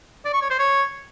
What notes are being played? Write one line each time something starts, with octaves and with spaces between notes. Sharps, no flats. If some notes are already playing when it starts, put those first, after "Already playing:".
D5
C#6
C#5
C5
C#5